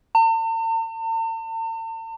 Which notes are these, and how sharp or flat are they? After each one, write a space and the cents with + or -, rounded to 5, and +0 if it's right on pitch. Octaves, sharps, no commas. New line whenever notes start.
A5 +45